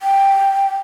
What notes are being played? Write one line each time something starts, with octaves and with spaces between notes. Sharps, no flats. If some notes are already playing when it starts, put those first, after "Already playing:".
G5